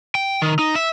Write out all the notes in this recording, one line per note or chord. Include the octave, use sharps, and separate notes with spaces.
G5
D#3
D#4
E5